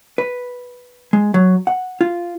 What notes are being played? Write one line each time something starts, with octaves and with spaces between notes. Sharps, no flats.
B4
G#3
F#3
F#5
F4